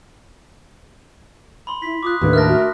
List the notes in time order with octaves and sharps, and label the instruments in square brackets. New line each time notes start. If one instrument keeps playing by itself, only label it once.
[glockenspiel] B5 C6
[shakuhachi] E4 [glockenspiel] B6
[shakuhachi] F4 [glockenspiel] D6 D#6 F#6
[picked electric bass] D#2 A2 D3 [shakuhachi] B4
[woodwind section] A3 D4 A#4 [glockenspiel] F6 F#6 A#6
[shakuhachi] F#4